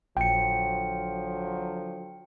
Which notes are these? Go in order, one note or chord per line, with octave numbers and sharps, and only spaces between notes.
A#1 D3 F3 F#3 G5 C#7